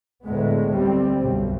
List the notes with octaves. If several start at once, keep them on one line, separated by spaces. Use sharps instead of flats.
D2 A2 G#3 A3 B3
G3 C4
B1 F#2